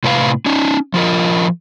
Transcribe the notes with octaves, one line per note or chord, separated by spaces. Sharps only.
A2 C3 B4 C5 F5
C#4 D#4
F3 F4 A#4 D#5